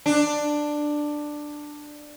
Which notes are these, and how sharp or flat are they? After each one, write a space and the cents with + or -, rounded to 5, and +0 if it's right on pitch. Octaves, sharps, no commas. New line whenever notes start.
D4 +10